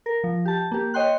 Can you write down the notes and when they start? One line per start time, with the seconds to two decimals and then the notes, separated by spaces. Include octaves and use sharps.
0.06 A#4
0.24 F3
0.45 G4 A5
0.71 A#3 G4
0.94 C#5 D#5 G5 C6 F#6